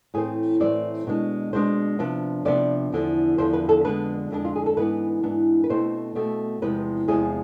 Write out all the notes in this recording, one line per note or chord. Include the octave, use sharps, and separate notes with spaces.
A2 E3 A3 C4 G#4
A2 E3 A3 C4 D5
B2 G#3 D4
B2 G#3 D4 C5
C3 F3 B3 D4
C3 F3 B3 D4 D5
E2 D3 F3
E2 D3 F3 C5
B4
A4
F2 D3 G#3 B3 D4 B4
F2 D3 G#3 B3 D4
F4
G#4
A4
G#2 E3 B3 D4 B4
G#2 E3 B3 D4
B4
B2 A3 C4 C5
B2 A3 C4
E2 C3 F3 G#3 B4
E2 C3 F3 G#3 G#4